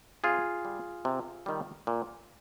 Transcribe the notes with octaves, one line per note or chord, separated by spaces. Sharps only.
C3 F4 G#4
G3
C3
D#3 G3
A#2